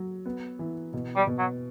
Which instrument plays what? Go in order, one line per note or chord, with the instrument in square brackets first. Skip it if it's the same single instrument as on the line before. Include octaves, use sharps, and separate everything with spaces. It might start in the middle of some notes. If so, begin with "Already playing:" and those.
Already playing: [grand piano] F#3
B3
E3
B2
[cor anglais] G3
[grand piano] B2
[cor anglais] F#3